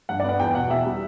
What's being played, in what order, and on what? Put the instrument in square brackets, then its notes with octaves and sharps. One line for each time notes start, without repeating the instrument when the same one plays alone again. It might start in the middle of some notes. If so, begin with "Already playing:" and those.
[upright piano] G2 F#5
D5
B3 F#5
E2 G5
B2 F#5
E2 E5
G3